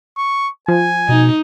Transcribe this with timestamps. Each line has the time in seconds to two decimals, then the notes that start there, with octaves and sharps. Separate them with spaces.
0.18 C#6
0.68 F3 G#5
1.09 B2 D#4